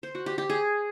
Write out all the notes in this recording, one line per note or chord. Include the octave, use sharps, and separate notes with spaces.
C5
F#4
G4
G4
G#4